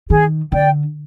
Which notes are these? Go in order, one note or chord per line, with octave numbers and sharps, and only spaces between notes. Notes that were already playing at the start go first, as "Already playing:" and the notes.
D#3 G#4
D3 D5 G5